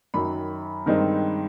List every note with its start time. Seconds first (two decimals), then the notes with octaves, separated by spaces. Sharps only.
0.14 F#2 D#3 F#3 B5
0.86 G2 D#3 G#3 C4 D#4